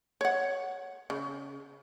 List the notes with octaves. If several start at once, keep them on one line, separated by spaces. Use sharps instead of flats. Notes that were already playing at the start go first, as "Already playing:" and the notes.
C#5 F#5
C#3